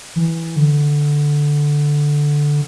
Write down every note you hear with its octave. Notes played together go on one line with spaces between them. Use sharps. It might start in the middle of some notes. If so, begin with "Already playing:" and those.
E3
D3